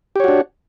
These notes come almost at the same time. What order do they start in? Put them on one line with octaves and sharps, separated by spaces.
G4 C#5 F#4 D4